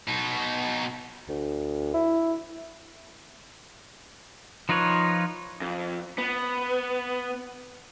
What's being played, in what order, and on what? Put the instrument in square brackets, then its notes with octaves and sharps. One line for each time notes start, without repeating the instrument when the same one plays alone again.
[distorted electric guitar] B2 D#4
[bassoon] D2
E4
[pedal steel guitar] F3 D#4 F4 B4 C#5
[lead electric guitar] F2
B3